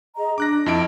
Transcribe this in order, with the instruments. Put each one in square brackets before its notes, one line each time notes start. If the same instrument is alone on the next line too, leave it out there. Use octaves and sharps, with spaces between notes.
[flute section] G#4 D#5 A#5
[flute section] D4 [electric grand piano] D6 F#6 A#6
[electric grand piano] F2 E4 D7 [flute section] D#5 A5